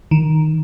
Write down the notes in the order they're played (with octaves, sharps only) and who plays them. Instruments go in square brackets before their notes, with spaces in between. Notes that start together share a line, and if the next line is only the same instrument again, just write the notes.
[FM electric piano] D#3